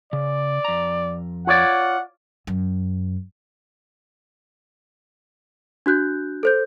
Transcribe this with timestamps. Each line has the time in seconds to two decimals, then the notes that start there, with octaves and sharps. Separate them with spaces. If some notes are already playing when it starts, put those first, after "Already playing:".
0.13 C#3 D5
0.65 F2 A#5
1.47 F4 C#5 D5 F#5
2.47 F#2
5.86 D4 F#4 F#6 G6
6.43 A4 C5 G6